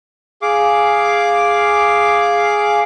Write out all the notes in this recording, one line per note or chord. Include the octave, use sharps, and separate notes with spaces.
G#4 F5 D6